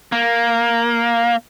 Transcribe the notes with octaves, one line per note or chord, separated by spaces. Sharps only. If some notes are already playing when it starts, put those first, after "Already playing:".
A#3